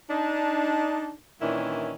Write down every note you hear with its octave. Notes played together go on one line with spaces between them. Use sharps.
D4 D#4
A#2 D#3 E3 C#4 D4 E4